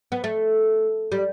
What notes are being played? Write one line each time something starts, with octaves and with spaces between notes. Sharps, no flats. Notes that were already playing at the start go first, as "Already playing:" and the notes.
B3
A3
G3